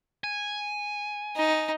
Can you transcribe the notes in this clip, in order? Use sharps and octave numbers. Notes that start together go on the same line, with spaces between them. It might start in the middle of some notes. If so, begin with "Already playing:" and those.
G#5
D#4